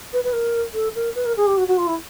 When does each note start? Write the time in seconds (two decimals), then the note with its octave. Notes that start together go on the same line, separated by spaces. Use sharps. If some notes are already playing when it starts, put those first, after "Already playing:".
0.13 B4
0.24 B4
0.33 A#4
0.74 A4
0.95 A#4
1.15 B4
1.26 A#4
1.37 G#4
1.47 G4
1.57 F#4
1.68 F#4
1.78 F4
1.87 E4